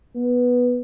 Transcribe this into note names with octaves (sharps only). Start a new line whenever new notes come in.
B3